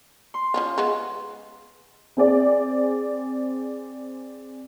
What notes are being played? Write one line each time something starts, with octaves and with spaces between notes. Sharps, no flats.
C6
F3 C#4 F4
G#3 B3 F4
C4 G#4 D5